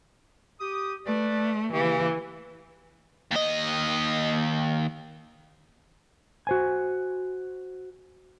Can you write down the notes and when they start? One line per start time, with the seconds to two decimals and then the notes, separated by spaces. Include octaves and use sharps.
0.60 G4 D#6
1.06 A3 B4 D5
1.73 C#3 E3 A#3 G4
3.31 D#2 D#5
6.47 F#4 C5 G#5